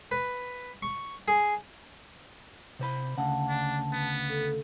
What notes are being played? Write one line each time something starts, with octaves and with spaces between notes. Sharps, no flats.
B4
C#6
G#4
C3 C5 B5
D2 C#3 F#5 A5
D4
B3
A4